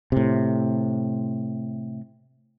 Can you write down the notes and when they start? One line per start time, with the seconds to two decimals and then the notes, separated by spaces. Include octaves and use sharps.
0.12 A2 C3